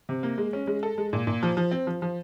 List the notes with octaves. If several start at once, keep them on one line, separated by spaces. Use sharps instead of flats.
C3
A#3
G#3
C#4
G#3
A4
G#3
A#2
A#2
F3
F3
C4
F3
F3